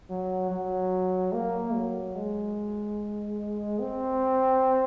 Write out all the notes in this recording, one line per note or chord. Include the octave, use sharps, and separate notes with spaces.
F#3
F#3
A#3
F#3
G#3
C4